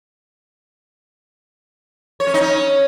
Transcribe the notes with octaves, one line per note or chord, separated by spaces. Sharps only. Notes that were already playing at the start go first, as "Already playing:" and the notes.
C#5
C#4
D#4
C#4